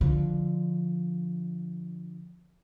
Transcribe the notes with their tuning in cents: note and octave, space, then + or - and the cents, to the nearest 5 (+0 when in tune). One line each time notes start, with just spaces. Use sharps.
D3 +10 F3 +0